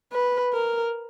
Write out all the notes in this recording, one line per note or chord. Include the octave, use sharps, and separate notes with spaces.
B4
A#4